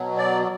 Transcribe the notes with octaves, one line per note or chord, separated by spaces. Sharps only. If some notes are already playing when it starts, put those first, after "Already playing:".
Already playing: B2 F#3
D5